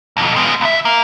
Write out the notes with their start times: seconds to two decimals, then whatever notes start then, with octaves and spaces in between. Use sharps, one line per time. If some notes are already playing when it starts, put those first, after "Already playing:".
0.17 B1 F2
0.36 G#3 B3
0.61 C#2 E5
0.85 A#3